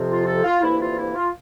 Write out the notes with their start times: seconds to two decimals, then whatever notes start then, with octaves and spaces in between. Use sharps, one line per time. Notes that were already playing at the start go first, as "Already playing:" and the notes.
Already playing: F2 C3 F3
0.08 F4
0.26 A4
0.43 F4
0.61 D2 C3 E3 A#3 E4
0.79 F4
0.97 E4
1.14 F4